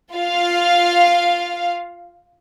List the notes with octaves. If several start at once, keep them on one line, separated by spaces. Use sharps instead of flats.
F4 F5